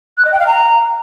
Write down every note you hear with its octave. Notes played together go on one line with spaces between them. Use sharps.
F#6
D#5
G5
F5
A#5